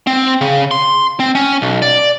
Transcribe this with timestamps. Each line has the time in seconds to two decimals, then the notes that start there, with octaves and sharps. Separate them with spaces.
0.07 C4
0.41 C#3
0.71 C6
1.20 C4
1.35 C#4
1.62 B1
1.82 D5